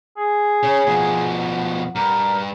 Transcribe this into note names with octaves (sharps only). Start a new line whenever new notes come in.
G#4
C#3 C#5
B2 F3 F#5
G2 A#4